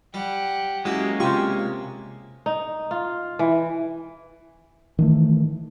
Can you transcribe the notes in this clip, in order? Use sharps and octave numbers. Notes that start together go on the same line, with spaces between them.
G3 G4 F#5
F#3 G#3 A#3 C#4 E4 G4
C3 F4 G4 C#6
D#4
F4
E3
D#3 E3 A3